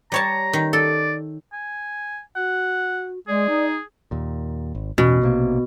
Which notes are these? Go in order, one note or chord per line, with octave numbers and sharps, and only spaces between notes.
G3 C#5 A5 A#5
D#3
A4 D5
G#5
F#4 F#5
G#3 G#4 D5
D#4
D#2 A#2
G#1
A1 E2 B2 C#4
A#1 C3 A#3